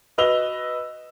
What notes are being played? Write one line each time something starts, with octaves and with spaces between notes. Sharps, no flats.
F#4 B4 D#5 E6 F7 G7